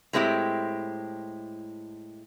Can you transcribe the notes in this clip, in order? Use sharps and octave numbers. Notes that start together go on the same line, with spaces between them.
A2 G#3 C4 E4 G4